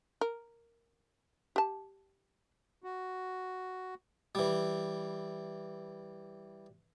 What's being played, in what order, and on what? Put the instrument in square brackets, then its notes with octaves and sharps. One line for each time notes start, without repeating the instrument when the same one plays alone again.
[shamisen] A#4
G4 A5
[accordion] F#4
[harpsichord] E3 G3